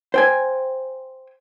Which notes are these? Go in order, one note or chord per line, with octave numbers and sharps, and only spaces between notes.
C5 G5 G#5